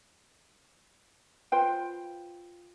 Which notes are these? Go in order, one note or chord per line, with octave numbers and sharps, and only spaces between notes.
F4 B4 C5 G5